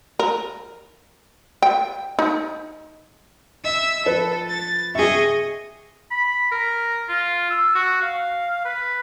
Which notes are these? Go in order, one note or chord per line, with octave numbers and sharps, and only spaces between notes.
A#4
G5
D#4
D#5 E5 E6
F3 A4 B4
A6
C3 G#4 D#5 E5 C#6
B5
A#4
F4
E6
F#4
F5
B4